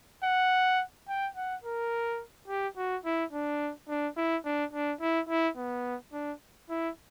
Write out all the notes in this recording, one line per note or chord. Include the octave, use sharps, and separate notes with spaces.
F#5
G5
F#5
A#4
G4
F#4
E4
D4
D4
E4
D4
D4
E4
E4
B3
D4
E4